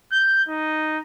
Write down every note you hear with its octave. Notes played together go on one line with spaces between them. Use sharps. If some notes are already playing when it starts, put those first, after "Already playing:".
G6
D#4